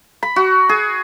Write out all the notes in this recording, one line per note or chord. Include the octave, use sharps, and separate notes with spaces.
B5
F#4
G#4